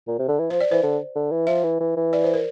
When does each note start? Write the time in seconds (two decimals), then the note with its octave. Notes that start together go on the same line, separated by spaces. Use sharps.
0.07 A#2
0.19 C3
0.28 D3
0.39 E3
0.50 F3 C5
0.61 D5
0.71 E3 C5
0.83 D3
1.16 D3
1.31 E3
1.47 F3 E5
1.63 E3
1.80 E3
1.96 E3
2.13 D5
2.24 C5
2.34 A#4